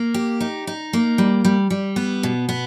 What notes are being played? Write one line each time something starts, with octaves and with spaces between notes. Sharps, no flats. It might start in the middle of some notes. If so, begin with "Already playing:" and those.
Already playing: A#3
G4
D#4
D#4
A#3
G3
G3
G3
B3
B2
B3